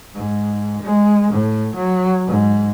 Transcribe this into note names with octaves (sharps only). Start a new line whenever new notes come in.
G#2
G#3
A2
F#3
G#2